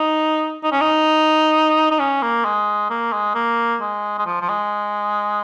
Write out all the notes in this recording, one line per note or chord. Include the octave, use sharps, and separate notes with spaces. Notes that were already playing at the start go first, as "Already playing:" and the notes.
Already playing: D#4
D#4
C#4
D#4
D#4
C#4
A#3
G#3
A#3
G#3
A#3
G#3
G#3
F3
F3
G#3